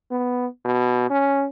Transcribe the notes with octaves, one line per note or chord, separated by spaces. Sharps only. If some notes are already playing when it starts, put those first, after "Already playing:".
B3
B2
C#4